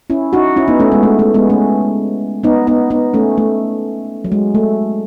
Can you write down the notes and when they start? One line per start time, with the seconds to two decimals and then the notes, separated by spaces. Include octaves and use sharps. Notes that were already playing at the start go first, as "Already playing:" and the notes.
0.10 C#4 E4
0.33 D#4 F#4
0.56 C#4 E4
0.68 B3 D#4
0.79 A3 C#4
0.92 G#3 B3
1.03 A3
1.19 A3
1.34 G#3 B3
1.50 A3 C#4
2.43 B3 D#4
2.67 B3 D#4
2.90 B3 D#4
3.14 A3 C#4
3.38 A3
4.25 F#3
4.32 G#3
4.55 A3